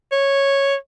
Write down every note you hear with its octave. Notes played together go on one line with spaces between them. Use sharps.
C#5